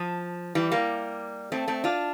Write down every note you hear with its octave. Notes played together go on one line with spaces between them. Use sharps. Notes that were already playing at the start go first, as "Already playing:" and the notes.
Already playing: F3
E3 G3
G3 A#3
A3 C4
A3 C4
D4 F4